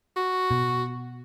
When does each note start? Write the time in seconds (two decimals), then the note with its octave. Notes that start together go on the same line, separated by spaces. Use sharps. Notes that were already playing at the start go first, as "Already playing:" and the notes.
0.16 F#4
0.51 B2